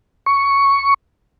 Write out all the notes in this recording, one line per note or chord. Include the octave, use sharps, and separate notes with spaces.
C#6